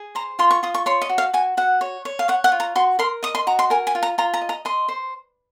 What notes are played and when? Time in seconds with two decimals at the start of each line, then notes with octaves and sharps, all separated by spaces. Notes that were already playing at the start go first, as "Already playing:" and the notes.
Already playing: G#4
0.15 C5 A#5
0.39 F4 C6
0.51 C#6
0.63 F4 D#6
0.74 C#6
0.86 C#5 C6
1.02 D#5
1.09 F#4
1.18 F5
1.34 F#4 G#5
1.57 F#4 F#5
1.81 C#5
2.05 C#5
2.19 F5
2.28 C#5 F#5
2.44 F#5
2.52 F4
2.60 A#5
2.76 F#4 C6
2.99 A#4 C6
3.23 D#5 D#6
3.35 C6
3.47 F#4 A#5
3.59 C6
3.70 A#4 G#5
3.87 G#5
3.95 F4
4.03 A#5
4.18 F4 A#5
4.34 A#5
4.41 D#5
4.49 A#5
4.65 D#5 C6
4.89 C5